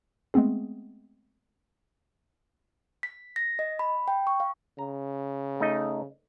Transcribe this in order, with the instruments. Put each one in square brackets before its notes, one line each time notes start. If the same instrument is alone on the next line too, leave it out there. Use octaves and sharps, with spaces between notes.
[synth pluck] G#3 A3 B3 C4 G#4
[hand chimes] B6
A#6
D#5
B5
G5
C#6
F5
[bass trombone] C#3 [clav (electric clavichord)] A#5
[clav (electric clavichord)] A3 D#4 D#5